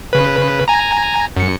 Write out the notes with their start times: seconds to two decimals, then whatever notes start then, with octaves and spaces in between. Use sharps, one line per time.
0.13 C#3 B4
0.68 G#5 A#5
1.37 F#2 C#7